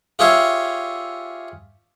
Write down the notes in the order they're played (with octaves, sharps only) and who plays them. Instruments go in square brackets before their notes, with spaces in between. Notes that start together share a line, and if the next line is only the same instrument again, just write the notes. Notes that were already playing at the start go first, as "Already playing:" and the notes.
[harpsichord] F4 G4 G#4 C#5 E5 F5